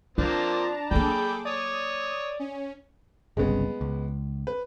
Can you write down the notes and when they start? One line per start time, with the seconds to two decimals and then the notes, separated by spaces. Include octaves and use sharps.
0.18 F3 A#3 C4 D4 F4 A5 A#5
0.91 F#3 A#3 G#4 A4 G5 B5 D6
1.45 C#5 D5 D#6
2.39 C#4
3.37 G1 C2 C#3 G#3 B3
3.81 C#2
4.47 B4